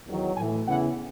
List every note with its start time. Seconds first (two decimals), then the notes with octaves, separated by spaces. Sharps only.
0.09 E2 D#3 F#3
0.37 A2 E3 G#5
0.66 E2 C#3 E3 F#5